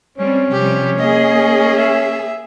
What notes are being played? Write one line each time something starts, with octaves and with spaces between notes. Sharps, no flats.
G3 C4 C#4
C3 F3 G3 G4
A#3 G#4 D#5
E5